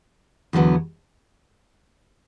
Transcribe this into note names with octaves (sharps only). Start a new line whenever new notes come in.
E2 D3 F#3 B3